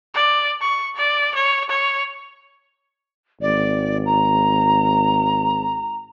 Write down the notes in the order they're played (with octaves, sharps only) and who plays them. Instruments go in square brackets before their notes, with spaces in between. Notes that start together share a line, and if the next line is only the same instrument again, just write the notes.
[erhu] D5
C#6
D5
C#5
C#5
[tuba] G#1 [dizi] D5
[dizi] A#5